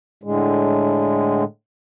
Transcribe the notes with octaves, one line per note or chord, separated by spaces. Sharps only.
A2 D3 G#3